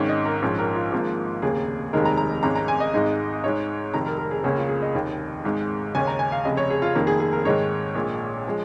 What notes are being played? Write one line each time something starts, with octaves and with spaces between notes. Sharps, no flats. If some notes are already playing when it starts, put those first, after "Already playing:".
Already playing: G#1 G#2 D#3 C#4
D#5
A#4
A#1 G#2 F3 C#4 G#4
A#4
F4
G#1 G#2 F3 A#3
F1 D#2 C#3 A#3 G#4
F1 D#2 D#3 G#3 D#4 A#4
A#5
A#5
G#1 G#2 G#3 C#4 A#5
A#5
G#5
D#5
G#1 G#2 G#3 D#4
G#2 G#3 D#4 C#5
F1 F2 D#3 A#5
A#4
A#4
G#4
C#2 C#3 A#3 C#4 G#4
F4
G#4
D#5
F1 D#2 D#3
G#1 G#2 G#3 D#4
D#2 C#3 G#3 C#4 G#5
A#5
G#5
F5
F1 F2 C#3 D#5
C#5
G#4
F4
F1 F2 D#3 A#3
G#4
G#4
A#4
G#2 D#3 G#3 D#4 C#5
A#1 A#2 G#3
F3 G#3